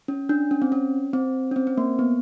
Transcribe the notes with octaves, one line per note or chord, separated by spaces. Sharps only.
C#4
D4
C#4
C4
C#4
C4
C#4
C4
C4
A#3
B3